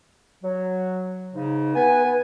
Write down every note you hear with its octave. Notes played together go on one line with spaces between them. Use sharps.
F#3
G#2 C#3 D#4
B3 B4 G#5